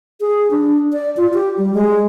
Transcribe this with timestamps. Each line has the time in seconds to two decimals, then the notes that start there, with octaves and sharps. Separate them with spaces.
0.21 G#4
0.51 D4
0.92 D5
1.17 F4
1.34 G4
1.58 G3
1.74 G#3